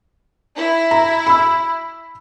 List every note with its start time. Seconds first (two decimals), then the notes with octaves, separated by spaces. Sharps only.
0.57 E4
0.91 A#5
1.27 B5 E6